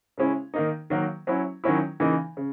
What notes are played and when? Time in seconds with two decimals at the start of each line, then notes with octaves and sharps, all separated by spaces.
0.18 C#3 G#3 C#4 E4
0.54 D#3 A#3 D#4
0.90 D#3 F#3 A#3
1.27 F#3 C#4 E4
1.64 D#3 F#3 C#4 E4
2.00 C#3 E3 A#3 D#4
2.37 C#3